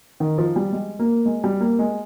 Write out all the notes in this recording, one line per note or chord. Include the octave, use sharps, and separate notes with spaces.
D#3
F3
G3
G#3
A#3
G#3
G3
A#3
G#3